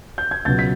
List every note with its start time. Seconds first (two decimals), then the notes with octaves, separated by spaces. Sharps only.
0.18 G6
0.31 G#6
0.45 C#2 B2 F#3 G6 A6
0.59 B6